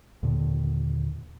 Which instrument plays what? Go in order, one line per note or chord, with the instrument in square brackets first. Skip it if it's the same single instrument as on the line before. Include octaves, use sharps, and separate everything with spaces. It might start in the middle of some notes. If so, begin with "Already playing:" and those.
[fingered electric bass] D#2 A#2 D3